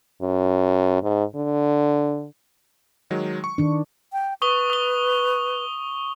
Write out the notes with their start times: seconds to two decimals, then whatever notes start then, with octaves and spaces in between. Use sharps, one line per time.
0.21 F#2
1.03 G#2
1.36 D3
3.10 D#3 F#3 G#3
3.44 C#6
3.58 D#3 D4
4.13 G5
4.42 B4 C#6 D#6 G7
4.70 D#6 G7